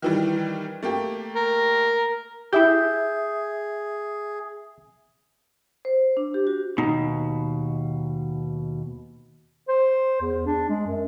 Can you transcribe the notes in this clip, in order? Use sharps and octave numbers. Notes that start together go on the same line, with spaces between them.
D#3 E3 G3
A3 A#3 G4
A#4
E4 G4 G#4 E5 G6
C5
D4
G4
F#4
D#2 B2 D#4
C5
E2
D4
G#3
F#2